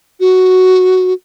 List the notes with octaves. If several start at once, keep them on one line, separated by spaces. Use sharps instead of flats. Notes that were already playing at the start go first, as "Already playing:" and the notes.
F#4